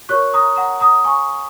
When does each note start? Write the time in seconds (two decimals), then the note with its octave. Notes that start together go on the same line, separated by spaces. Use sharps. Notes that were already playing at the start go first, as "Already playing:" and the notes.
0.09 F#4 A#4 C#5 C#6 F#6
0.33 A#5 D#6
0.56 F#5 A#5
0.80 A#5 D#6
1.04 G#5 C#6